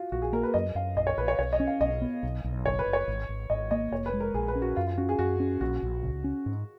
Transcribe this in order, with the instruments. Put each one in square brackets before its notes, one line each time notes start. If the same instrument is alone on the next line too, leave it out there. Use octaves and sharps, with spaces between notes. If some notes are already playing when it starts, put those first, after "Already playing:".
Already playing: [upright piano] F4 F#4
[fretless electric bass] A#1 [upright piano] F#4
[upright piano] G#4
[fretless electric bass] A#3 [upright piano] A#4
[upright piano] B4
[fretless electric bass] F#2 [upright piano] D#5
[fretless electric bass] F#2 [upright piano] F5
[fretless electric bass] A#1 [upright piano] D#5
[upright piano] C#5
[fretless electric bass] A#1 [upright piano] B4
[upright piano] C#5
[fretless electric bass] B1 [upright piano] C#5
[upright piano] D#5
[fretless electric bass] C#4
[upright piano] F5
[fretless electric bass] B1 [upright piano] D#5
[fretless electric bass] B3
B1
B1
[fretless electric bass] F#1 [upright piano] C#5
[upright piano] B4
[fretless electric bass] F#1
[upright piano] C#5
[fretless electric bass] G#1
G#1
[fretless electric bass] G#1 [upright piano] D#5
[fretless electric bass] A#3 [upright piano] D#5
[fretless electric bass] F1 [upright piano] C#5
[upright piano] B4
[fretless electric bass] G#3
[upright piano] A#4
[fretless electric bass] A#1 [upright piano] G#4
[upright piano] B4
[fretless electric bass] C#4
[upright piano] F#4
[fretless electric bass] F#2 [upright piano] F4
[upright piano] F4
[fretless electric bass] C#4 [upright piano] F#4
[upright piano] G#4
[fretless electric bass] F#2 [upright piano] F#4
[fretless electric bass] C#4
[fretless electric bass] A#1 [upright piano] F#4
[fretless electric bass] A#1
C#2
C#4
G#2